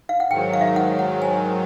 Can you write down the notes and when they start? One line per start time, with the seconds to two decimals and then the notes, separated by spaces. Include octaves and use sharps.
0.09 F5
0.20 F#5
0.31 G#2 D#3 F#3 G5
0.53 F5
0.61 E5
0.67 F5
0.76 F#5
0.99 F#5
1.22 G#5